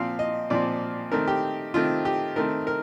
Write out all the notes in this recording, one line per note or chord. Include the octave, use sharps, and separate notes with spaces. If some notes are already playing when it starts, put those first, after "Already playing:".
Already playing: A#2 F3 C4 F5
D#5
A#2 F3 C4 D5
D#3 A3 C4 A#4
G4
D#3 A3 C4 F4
G4
D#3 A3 C4 A#4
A#4